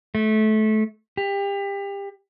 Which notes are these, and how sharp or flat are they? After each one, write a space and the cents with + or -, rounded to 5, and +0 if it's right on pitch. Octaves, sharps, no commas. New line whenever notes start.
A3 -25
G4 +30